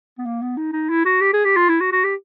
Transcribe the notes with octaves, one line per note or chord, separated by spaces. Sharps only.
B3
A#3
B3
D#4
D#4
E4
F#4
G4
G#4
G4
F4
E4
F#4
F#4
G4